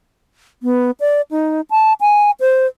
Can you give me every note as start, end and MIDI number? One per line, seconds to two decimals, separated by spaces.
0.63 0.91 59
1.00 1.21 74
1.31 1.61 63
1.71 1.93 81
2.01 2.31 80
2.40 2.66 72